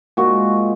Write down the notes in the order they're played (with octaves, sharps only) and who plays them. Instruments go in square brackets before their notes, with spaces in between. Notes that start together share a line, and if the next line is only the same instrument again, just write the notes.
[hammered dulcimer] A#2 G#3 F#4